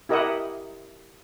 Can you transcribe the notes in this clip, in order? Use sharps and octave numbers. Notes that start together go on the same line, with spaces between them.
E4 G4 A#4 D#5 E5 F#5